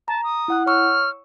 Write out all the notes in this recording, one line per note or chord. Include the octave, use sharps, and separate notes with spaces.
A5 A#5
D#6
E4 F#5 F#6
C#5 C#6 E6 F6